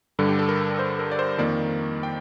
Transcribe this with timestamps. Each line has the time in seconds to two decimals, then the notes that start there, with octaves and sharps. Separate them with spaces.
0.19 G2 D3 G3 A4
0.29 G4
0.39 A4
0.49 A#4
0.79 C5
0.99 A#4
1.12 D5
1.19 C5
1.38 F2 D#3 A#3 D5
2.03 G5